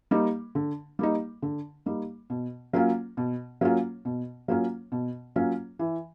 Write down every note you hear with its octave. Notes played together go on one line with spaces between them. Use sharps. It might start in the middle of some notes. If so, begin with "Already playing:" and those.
G3 A#3 D#4
D3
G3 A#3 D#4
D3
G3 A#3 D#4
B2
F#3 A#3 C#4 F4
B2
F#3 A#3 C#4 F4
B2
F#3 A#3 C#4 F4
B2
F#3 A#3 C#4 F4
E3